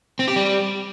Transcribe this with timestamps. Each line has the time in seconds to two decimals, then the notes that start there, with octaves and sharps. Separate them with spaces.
0.19 C4
0.28 G4
0.36 G3